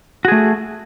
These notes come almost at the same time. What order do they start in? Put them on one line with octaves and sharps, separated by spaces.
F#4 G#4 A3